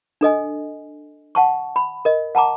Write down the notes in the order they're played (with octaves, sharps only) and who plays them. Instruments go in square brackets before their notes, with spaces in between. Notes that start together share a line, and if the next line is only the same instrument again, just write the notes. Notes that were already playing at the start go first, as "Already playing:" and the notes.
[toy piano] D4 A4 D#5 G#5
F#5 A5 C#6
B5
A#4 D#5
F#5 A5 A#5 D6